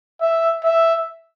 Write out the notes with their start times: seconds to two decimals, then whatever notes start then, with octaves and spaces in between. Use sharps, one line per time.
0.21 E5
0.64 E5